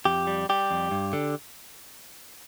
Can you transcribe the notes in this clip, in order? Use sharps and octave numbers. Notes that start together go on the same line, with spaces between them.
F2 G4
G3
G3 G4
F2
G2
D3